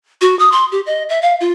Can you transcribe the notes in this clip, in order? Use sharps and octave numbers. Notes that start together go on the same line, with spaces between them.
F#4
D#6
C6
G4
D#5
E5
F5
F4